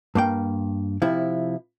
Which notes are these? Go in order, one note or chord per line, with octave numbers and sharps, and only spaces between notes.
G2 A#3 G5
C3 F3 E4